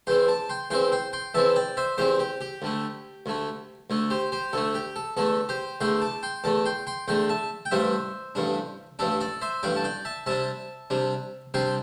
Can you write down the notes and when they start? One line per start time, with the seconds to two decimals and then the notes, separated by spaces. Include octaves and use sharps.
0.07 E2 E3 C4 G5 C6
0.28 A5 D6
0.49 G5 C6
0.70 E2 E3 C4 G5 C6
0.92 G5 C6
1.13 G5 C6
1.34 E2 E3 C4 E5 A5
1.56 D5 G5
1.77 C5 E5
1.98 E2 E3 C4 G4 C5
2.19 G4
2.41 G4
2.62 D2 D3 A3
3.26 D2 D3 A3
3.90 D2 D3 A3
4.10 G4 C5
4.32 G4 C5
4.53 D2 D3 A3 A4
4.74 G4
4.96 A4
5.17 E2 D3 A3 A4
5.49 G4 C5
5.80 E2 D3 A3 G5 C6
6.02 A5 D6
6.23 G5 C6
6.44 E2 D3 A3 A5 D6
6.65 G5 C6
6.87 G5 C6
7.08 E2 D3 A3 G5 C6
7.29 E5 A5
7.65 G5
7.71 A1 G2 G3 D4 C5 E5
8.35 A1 G2 G3 D4
8.99 A1 G2 G3 D4 A4 D5
9.21 A4 D5
9.41 C5 E5
9.63 A1 G2 G3 D4 D5 G5
9.76 A5
9.84 D5 G5
10.05 E5 A5
10.26 C3 G3 D4 E5 A5
10.90 C3 G3 D4
11.54 C3 G3 D4 G5 C6